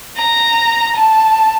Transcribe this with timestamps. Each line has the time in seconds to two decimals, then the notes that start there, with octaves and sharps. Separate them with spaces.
0.17 A#5
0.96 A5